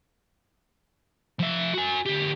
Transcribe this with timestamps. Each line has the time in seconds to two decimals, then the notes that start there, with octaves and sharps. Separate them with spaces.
1.39 F3 E5
1.74 F#4 G#5
2.06 D2 G4